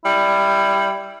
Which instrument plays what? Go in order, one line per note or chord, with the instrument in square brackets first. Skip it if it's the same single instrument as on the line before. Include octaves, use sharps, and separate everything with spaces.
[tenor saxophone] G3 [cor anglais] E4